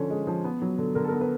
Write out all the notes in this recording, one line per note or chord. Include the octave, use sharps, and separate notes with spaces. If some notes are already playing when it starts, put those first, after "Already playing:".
Already playing: D3 F3 C#4
G#3
F3
B3
F#3
D3
D3 A#4
A4
A#4
B3
B4